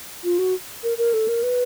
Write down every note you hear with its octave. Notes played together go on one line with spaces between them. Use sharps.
F4
F#4
A#4
A#4
A4
A#4
B4